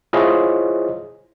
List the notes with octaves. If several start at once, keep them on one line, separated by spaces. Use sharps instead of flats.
E4 F4 G#4 C5 C#5 D#5